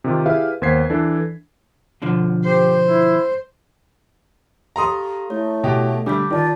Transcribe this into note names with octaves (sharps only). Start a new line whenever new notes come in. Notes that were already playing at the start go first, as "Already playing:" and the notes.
C3 D#3 F4 G4
E4 G4 G#4 B4 E5 F5
D#2 B3 C5 G#6 B6 C7
E3 D4 A4
B2 D3 F3
G4 C5
E4
G4 A4 F5 A#5 C6 D#6
A3 E4 C#5
B2 G4
D3 G3 D6 G6 B6
D#3 F4 D5 A5